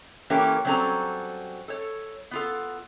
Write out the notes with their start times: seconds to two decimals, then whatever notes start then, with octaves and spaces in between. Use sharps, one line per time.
0.30 E3 A#3 C#4 G4 A4 A#4
0.65 F#3 G3 C4 C#4 A4 A#5
1.68 A4 C#5
2.31 B3 F4 A4